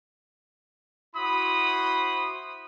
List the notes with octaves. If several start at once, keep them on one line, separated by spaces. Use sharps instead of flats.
E4 F#4 C5 B5 C6 D#6